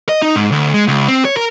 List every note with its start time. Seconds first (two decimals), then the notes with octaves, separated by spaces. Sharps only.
0.09 D#5
0.22 D#4
0.36 G#2
0.52 D2
0.74 G#3
0.88 C#2
1.08 C4
1.25 C#5
1.37 A#4